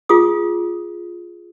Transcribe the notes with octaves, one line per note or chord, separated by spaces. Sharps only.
F4 G#4 D#6